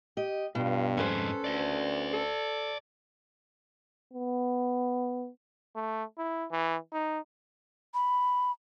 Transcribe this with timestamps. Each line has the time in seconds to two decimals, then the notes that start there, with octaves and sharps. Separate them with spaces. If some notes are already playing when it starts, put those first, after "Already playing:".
0.17 G4 D#5
0.55 G2 B2 F4
0.97 F2 G#2 C#4 A4 B4 C5
1.44 D2 D5 E5
2.13 A4
4.13 B3
5.76 A3
6.18 E4
6.51 E3
6.92 D#4
7.94 B5